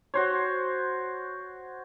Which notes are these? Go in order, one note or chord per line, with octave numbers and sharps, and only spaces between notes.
F#4 C5 C#5